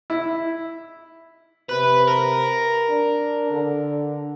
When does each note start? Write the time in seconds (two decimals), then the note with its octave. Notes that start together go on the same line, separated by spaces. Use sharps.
0.10 E4
1.69 C3 B4
2.08 A#4
2.89 D4
3.50 D3